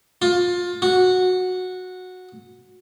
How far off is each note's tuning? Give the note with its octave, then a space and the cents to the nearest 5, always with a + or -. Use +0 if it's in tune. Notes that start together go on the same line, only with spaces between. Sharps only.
F4 +20
F#4 -10